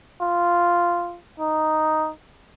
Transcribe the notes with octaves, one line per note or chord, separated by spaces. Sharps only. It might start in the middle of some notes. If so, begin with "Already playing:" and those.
F4
D#4